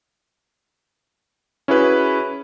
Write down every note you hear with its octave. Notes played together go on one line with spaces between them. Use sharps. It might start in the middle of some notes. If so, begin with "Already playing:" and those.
C#4 E4 F#4 G#4 B4